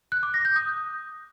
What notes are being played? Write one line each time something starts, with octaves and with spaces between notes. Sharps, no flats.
F#6
D6
A#6
G6
D#6